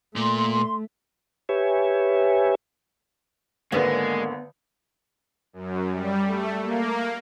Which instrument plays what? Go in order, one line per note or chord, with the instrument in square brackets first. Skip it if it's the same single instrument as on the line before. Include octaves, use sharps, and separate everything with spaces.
[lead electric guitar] A#2 [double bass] A3 [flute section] C6
[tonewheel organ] G4 B4 C#5 E5 G#5
[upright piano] G#1 D3 [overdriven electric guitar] G#3 [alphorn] A#3 [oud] B3
[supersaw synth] F#2
G3
A3
A#3